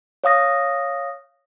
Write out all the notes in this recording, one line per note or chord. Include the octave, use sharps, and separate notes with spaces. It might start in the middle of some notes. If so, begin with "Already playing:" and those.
C#5 F5 D#6 A#6